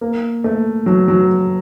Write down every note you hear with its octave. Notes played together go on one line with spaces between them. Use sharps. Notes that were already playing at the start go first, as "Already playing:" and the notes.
A#3
A3
F#3
F#3